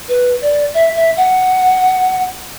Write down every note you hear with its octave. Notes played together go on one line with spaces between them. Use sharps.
B4
D5
E5
E5
F#5